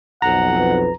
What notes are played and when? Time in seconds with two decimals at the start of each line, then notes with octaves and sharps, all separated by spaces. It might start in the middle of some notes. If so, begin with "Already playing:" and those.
0.22 B1 F2 F#5 A#5
0.57 B4